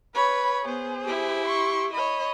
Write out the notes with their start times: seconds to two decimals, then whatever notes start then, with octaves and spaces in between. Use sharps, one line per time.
0.14 B4 C#5 B5
0.65 B3 G#4 C5
1.04 E4 G4
1.46 C6 C#6
1.94 C#5 D#5 B5